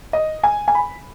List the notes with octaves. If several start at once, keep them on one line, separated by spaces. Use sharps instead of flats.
D#5
G#5
G#5
B5